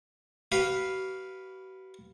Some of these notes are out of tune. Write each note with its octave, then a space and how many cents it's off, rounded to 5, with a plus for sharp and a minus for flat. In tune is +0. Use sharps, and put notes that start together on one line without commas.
F#4 +45 B4 +0 F5 +0